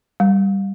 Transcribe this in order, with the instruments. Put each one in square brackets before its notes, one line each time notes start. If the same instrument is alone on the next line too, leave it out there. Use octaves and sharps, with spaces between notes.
[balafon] G3